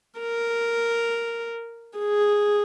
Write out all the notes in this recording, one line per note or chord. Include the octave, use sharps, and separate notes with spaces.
A#4
G#4